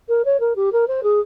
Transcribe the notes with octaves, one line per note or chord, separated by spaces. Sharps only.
A#4
C#5
A#4
G4
A#4
C5
G#4